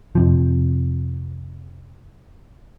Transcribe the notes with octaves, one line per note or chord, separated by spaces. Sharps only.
F2 C3 F3